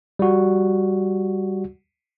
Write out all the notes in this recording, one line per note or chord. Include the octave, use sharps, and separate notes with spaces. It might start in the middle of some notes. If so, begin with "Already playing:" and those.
G3 F#4